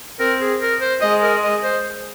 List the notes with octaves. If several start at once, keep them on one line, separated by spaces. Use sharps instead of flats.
C4 A#4
G#4
A#4
C5
G#3 D#5
A#4
D#5
C5